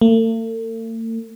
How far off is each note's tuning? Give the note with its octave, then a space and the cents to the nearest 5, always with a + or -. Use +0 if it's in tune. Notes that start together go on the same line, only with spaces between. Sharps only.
A3 +45